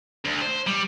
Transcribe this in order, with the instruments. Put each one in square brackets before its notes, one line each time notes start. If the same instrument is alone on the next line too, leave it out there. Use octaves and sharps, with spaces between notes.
[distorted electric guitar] D2
C5
G3